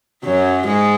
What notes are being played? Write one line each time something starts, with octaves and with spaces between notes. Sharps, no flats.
F#2 F#3
G#2 G#3